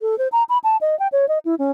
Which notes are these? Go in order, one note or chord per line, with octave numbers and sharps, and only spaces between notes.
A4
C5
A#5
B5
A5
D#5
G5
C#5
D#5
E4
C#4